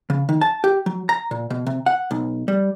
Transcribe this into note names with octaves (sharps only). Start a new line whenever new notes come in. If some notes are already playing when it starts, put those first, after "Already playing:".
C#3
D#3
A5
G4
F#3
A#5
A#2
B2
C3
F#5
B1
G3